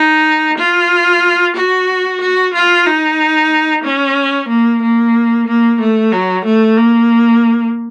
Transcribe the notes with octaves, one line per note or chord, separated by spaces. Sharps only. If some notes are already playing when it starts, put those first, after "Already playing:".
Already playing: D#4
F4
F#4
F#4
F4
D#4
C#4
A#3
A#3
A#3
A3
F#3
A3
A#3